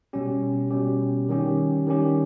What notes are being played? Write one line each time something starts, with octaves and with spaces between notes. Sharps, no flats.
B2 G3 C#4 G4
B2 G3 C#4 G4
D#3 G3 C#4 G4
D#3 G3 C#4 G4